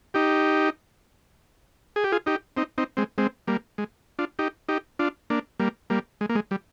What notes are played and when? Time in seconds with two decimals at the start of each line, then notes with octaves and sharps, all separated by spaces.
0.14 D#4 G4
1.96 G#4
2.04 G4
2.12 F4 G#4
2.26 D#4 G4
2.57 C4 D#4
2.78 C4 D#4
2.97 G#3 C4
3.18 G#3 C4
3.47 G3 A#3
3.78 G#3
4.19 D4 F4
4.39 D#4 G4
4.69 D#4 G4
4.99 D4 F4
5.30 A#3 D4
5.59 G3 A#3
5.90 G3 A#3
6.21 G#3
6.29 A#3
6.35 G#3
6.51 G3